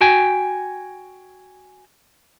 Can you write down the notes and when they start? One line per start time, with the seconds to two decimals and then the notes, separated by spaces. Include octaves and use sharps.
0.01 F#4 G5 G#5